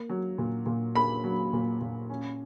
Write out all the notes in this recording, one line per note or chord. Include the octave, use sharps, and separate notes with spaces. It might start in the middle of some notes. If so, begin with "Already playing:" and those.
Already playing: A#3
F#3
A#2
A#2
A#3 B5
F#3
A#2
A#2
C#4